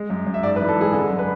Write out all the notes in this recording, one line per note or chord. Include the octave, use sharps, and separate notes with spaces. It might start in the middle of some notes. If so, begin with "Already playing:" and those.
Already playing: G#3
F#2
F#2
E5
G#2 D5
B4
E3
A4
G#3 G#4
D3 A4
F#2
B4